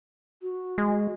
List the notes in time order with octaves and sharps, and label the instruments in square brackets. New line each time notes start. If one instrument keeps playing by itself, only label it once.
[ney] F#4
[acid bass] G#3